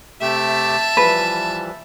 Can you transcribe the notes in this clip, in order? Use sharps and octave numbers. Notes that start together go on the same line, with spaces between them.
C3 A3 G4 E5 A5
E3 F3 G3 B4